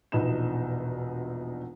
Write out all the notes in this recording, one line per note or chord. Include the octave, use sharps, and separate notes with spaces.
E1 A#1 B2 D#4 B4 E7